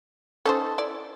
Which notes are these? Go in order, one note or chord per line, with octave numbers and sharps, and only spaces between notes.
C#4 D#4 A4 C5 A5
E4 D5